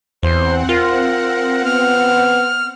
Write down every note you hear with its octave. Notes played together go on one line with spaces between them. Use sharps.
E2 C4 C5 F#5
F4 A#4
B3 F6